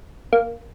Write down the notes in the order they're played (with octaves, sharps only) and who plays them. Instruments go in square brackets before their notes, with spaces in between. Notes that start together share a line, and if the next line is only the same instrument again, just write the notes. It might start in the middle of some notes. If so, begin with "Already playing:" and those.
[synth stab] A#3